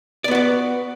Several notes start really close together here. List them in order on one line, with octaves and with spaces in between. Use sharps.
D5 B3 F#4 B4